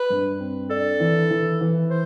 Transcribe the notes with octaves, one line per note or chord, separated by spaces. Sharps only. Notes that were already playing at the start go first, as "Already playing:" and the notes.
Already playing: B4
G2
C4
D4 A4
E3
E3
E3
C5